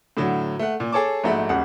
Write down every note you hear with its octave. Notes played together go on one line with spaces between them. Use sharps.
A2 D3 F#3
A3 F#5
A#2
G#4 A4 C#5 A5 D6
A#1 G#2 A3 F#4 B5
D#1 C#2 F#5